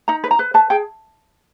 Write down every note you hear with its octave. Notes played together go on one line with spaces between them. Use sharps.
D#4 A#5
B4
A#5
B4
B4 A5
G#4 G5